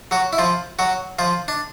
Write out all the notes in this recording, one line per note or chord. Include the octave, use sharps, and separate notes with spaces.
F#3 F#4
E4
F3 F4
F#3 F#4
F3 F4
D4